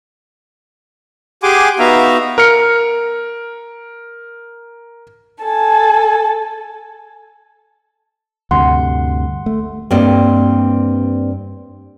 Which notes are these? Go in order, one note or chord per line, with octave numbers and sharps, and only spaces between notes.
G4 G#4 F#5 G#5 C6 D6
B3 D#4 F#4 E5 F5 A#5
A#4 F6 C#7
A4 G#5
D2 G2 C3 F#5 C6
A3
G2 G3 A#3 C4 D5 D#5